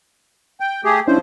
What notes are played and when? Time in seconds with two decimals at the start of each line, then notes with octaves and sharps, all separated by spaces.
0.60 G5
0.84 A3 G4 G#4
1.07 F3 C#4 D4 E4 C5